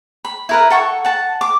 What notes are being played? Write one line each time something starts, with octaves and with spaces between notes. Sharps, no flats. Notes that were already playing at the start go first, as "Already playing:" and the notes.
B5
E4 A#4 B4
A4 F#5 C#6
F#5 A5
D6